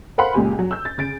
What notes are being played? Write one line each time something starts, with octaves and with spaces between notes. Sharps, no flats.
A#4 C5 F5 F#5 B5 C6
C#2 A#2 C#3 G4 G#5
F#3
E6 G6
A6
C#3 A6 D7